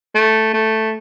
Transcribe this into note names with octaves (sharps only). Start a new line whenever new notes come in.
A3
A3